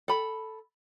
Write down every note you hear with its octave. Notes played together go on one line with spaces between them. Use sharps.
A4 B5